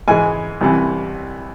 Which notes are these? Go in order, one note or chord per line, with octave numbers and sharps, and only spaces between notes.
G#2 E3 G#3 G#5
C2 C3 E3